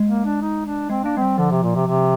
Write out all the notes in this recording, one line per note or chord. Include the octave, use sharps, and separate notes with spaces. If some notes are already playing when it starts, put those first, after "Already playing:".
Already playing: G#3
A#3
D4
D#4
D4
G#3 C4
A#3 D4
G#3 C4
G3
D3 F3
C3
A#2
C3
C3